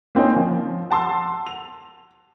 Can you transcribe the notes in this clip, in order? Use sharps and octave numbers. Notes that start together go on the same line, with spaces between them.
A#3 C4 C#4 D#4
F3
F#5 A5 C6 E6
F7